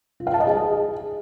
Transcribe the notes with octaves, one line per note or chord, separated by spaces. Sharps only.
F4
F5
A5
D#5
G#4